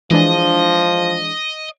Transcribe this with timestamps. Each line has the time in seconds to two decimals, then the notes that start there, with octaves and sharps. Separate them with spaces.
0.11 E3 F3 G#3 D4 D#5